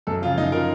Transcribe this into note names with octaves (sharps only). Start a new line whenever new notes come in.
F#2 A4
C#3 F3 F4
F#2 D#4
C#3 F3 A#4